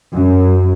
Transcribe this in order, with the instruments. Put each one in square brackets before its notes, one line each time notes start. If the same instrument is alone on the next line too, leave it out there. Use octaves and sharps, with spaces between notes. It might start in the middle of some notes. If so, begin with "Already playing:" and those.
[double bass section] F#2